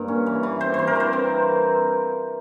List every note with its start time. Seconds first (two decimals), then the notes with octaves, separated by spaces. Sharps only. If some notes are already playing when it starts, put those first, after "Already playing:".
Already playing: G2 A#2 A#3
0.08 C#4
0.26 E3
0.43 E3
0.61 C4 C5
0.74 E3 C5
0.87 A#4
0.96 E3 C5
1.13 C4